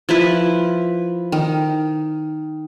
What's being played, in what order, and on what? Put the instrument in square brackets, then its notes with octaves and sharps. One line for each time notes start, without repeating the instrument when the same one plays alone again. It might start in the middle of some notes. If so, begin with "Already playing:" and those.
[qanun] F3 E4 B4
D#3